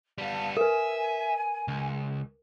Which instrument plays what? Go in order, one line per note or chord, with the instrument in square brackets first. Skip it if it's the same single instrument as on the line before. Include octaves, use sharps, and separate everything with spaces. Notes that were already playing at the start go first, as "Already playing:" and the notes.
[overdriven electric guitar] G3 B3 [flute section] F5 A5
[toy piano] A#4 B4 [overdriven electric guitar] E5 [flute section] G#5
[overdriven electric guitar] C#2